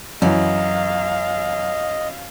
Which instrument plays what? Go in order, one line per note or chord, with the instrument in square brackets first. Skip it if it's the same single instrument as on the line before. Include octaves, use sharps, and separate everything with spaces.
[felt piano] F#2 E3 [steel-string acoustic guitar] F#3 [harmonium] D#5 [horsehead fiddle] F5